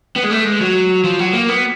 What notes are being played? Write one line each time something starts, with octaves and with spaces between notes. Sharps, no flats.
B3
G#3
A3
G#3
F#3
F3
F#3
A#3
B3